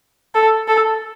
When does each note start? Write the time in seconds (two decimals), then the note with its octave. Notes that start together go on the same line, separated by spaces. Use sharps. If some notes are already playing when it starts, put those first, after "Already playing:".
0.35 A4
0.68 A4